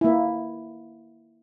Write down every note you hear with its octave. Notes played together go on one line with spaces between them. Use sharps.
A#3 E4